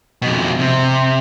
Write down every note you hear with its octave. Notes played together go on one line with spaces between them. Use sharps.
F2 B2
C3